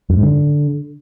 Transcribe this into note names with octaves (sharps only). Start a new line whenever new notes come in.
F#2
G#2
D3